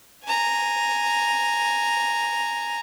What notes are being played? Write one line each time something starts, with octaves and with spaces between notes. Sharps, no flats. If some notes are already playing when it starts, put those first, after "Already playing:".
G#5 A#5